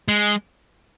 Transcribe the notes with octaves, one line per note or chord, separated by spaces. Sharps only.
G#3